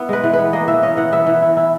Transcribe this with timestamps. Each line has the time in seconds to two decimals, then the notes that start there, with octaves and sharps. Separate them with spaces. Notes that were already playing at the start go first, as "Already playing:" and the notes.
Already playing: B3 E4
0.09 G#3 B4
0.23 E3
0.33 B4
0.39 B3
0.53 A#3 D#5
0.68 E3 E5
0.83 C#4 D#5
0.97 E3 F#5
1.12 B3 E5
1.27 E3
1.42 E4
1.57 E4